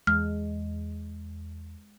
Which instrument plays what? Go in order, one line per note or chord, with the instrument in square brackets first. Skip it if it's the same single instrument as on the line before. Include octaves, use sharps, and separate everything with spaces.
[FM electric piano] E2 [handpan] G#3 [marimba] F6